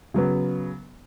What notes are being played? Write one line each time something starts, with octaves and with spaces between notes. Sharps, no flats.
C#3 F#3 B3